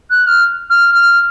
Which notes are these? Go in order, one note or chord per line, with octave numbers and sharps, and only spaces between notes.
F#6
F6
F6
F6